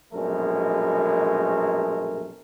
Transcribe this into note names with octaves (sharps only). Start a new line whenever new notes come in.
A#1 F#2 B2 G#3 A3 A#4